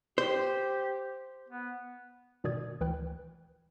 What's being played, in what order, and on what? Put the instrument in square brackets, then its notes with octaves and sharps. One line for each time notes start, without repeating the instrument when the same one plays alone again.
[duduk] G4 [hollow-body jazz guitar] C5
[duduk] B3
[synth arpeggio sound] G#2 B2 D#3 D5 D#6 G#6
D2 E3 B4 G5 F#6